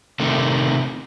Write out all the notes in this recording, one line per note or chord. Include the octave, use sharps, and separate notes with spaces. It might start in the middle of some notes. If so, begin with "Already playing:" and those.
C3 D#3 A3